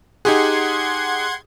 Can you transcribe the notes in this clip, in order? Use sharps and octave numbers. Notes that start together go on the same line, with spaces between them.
D#4 G4 G#4 F#5 C6 G#6